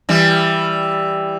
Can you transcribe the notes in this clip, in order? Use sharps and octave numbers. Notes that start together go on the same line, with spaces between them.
E3 G3